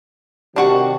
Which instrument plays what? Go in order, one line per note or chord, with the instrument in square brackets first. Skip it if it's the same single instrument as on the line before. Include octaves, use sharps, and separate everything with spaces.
[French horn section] C3 D#3 G4 [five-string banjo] D4 F#4 F#5